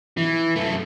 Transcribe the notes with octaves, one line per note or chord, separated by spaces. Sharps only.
E3
F#2 A3